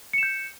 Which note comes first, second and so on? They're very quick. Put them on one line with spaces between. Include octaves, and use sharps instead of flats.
C#7 E7 G6